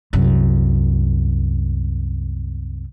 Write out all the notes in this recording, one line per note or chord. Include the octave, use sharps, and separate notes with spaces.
C2 F#2